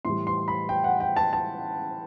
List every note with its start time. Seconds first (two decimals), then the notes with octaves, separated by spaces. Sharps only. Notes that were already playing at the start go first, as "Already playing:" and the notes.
0.05 A2 E3 G3 C6
0.27 C6
0.48 B5
0.69 G5
0.84 F#5
1.00 G5
1.16 A5
1.33 A5